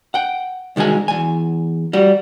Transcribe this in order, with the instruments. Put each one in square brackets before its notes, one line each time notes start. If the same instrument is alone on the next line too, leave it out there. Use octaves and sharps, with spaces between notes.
[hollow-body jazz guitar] F#5 G5
C2 D#3 G#3 F#4 G#5
E2 G#5
G3 F#4